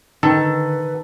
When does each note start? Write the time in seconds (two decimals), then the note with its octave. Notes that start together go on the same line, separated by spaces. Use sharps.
0.23 D3 D#3 A4 B4